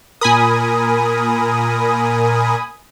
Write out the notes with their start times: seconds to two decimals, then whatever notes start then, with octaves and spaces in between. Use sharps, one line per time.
0.21 A#2 A#4 G#5 B5 D#6